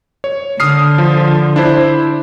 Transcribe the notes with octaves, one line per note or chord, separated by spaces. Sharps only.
C#5
D3 D#6 F6 C7
F3
D4 E4 C5